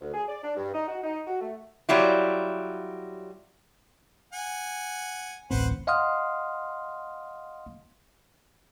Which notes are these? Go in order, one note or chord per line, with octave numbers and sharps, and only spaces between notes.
D2
G#4
D5
D4
G2
D#4
F#4
D#4
F#4
A3
F#3 G3 E4 F4
F#5 G#5
D1 A1 C4 B4 C5 F#5
D#5 F5 F#5 C6 D#6 F6